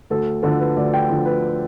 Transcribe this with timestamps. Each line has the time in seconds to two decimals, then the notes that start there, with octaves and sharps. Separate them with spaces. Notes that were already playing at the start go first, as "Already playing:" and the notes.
0.10 D2 A4
0.43 D3 F3 A4
0.60 B4
0.76 D2 D5
0.94 G5
1.09 D3 F3
1.25 B4